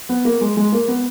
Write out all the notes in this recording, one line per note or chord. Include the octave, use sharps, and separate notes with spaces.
B3
A#3
G#3
G#3
A#3
B3